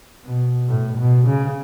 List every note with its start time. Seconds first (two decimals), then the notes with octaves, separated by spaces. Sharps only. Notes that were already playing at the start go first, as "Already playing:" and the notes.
0.25 B2
0.69 A2
0.98 B2
1.28 C#3